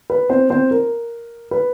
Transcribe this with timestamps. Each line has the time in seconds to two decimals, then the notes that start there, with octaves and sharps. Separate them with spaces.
0.10 B4
0.29 C4 C5
0.50 C4 C5
0.71 A#4
1.51 B4